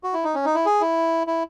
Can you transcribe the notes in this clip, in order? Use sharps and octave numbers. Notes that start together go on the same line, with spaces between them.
F#4
E4
D#4
C#4
D#4
E4
G#4
E4
E4